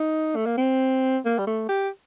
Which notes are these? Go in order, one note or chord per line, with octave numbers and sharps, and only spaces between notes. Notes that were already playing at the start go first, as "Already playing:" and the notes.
Already playing: D#4
A3
A#3
C4
A#3
G3
A3
G4